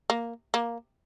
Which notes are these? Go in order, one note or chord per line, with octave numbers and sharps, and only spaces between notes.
A#3
A#3